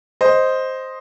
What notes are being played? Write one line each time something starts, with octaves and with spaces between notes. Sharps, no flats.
C5 D#5